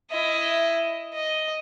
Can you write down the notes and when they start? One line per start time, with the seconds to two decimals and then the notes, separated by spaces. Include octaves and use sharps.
0.11 E4 D#5
1.14 D#5